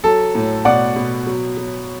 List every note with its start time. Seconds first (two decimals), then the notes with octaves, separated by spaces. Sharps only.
0.04 F#3 A4
0.35 A2
0.65 B2 D5 F#5
0.96 B2
1.26 F#3
1.57 F#3